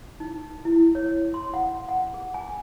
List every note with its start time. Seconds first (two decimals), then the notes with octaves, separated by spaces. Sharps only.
0.20 D#4
0.65 E4
0.95 C#5
1.34 C6
1.54 F#5
1.89 F#5
2.14 G#4
2.34 G#5